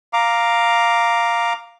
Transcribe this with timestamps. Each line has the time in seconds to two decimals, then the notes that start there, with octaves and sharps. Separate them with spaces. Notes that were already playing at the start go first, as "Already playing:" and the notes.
0.13 F5 A#5 D6